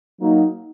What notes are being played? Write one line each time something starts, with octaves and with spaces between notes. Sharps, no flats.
F#3 A#3 D#4